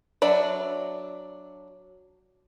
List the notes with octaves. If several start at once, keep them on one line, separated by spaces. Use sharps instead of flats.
F#3 D4 D5 E5